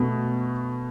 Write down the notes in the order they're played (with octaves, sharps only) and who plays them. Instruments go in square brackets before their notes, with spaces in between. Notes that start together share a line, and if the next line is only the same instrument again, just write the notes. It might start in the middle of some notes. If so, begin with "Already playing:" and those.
Already playing: [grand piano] B2 A3